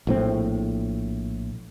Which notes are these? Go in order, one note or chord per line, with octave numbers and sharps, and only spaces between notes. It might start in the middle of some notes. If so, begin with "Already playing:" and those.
A#1 A2 C4